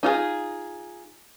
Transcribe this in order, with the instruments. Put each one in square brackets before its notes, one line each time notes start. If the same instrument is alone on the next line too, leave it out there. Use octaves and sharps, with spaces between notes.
[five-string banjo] D#4 F4 F#4 G#4